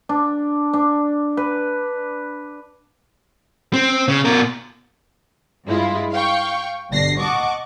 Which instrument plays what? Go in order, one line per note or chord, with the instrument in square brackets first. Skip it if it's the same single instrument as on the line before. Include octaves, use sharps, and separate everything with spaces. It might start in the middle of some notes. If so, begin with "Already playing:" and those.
[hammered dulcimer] D4
D4
B4
[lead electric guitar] C4
C#3
B2 A#4
[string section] G2 G#3 E4 F4
F5 G5 C#6
G1 B2 D4 A#6 C7
D#5 F#5 A5 C#6 D6